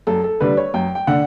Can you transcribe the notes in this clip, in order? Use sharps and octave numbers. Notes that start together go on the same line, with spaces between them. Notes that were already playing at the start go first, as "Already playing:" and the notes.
F#2 A4
A4
D3 G3 B4
C#5
F#2 G5
G5
D3 F#5